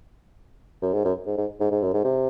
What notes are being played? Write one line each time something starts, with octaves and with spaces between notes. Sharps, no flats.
F#2
G#2
F#2
G#2
G#2
G#2
G#2
F#2
G#2
C3